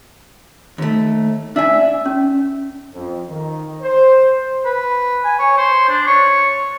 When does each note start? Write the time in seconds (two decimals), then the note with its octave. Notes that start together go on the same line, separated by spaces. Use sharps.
0.78 D#2 A3
1.56 D4 E5 G#5
2.06 C#4
2.94 F2
3.29 D#3
3.82 C5
4.65 B4
5.25 G#5
5.39 C#5
5.57 C5
5.89 D4
6.07 C#5